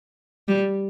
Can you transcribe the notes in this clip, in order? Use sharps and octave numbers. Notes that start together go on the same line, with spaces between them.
G3